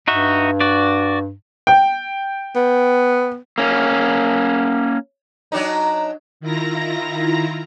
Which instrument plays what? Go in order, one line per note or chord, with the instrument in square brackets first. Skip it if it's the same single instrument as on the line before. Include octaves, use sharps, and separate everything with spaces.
[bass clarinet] G2 [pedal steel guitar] D#4 F#4 E5
[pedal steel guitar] F#4 D5
[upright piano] G5
[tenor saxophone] B3
[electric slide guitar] A#3 C#4
[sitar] F#3 D4 D#4
[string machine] D#3 E4 F4 A#5 A#6